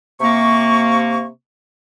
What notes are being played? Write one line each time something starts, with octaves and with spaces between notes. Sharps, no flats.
C3 A#3 C#6